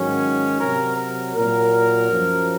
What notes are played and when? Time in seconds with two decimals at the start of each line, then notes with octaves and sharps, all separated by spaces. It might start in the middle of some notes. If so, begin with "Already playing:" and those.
Already playing: G#2 D#3 F#3 C#4
0.58 C3 F#3 A#4
0.96 A#4
1.34 A#2 F#3 A#4
2.10 F#2 F3